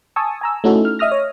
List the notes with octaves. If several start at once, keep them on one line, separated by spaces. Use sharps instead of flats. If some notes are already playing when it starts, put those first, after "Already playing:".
G#5 A5 C#6 D#6 E6
G#5 A#5 E6
A3 C#4 D#4 E4 F#4 A4
F6
D#5 E5 D#6 F6 A#6
C#5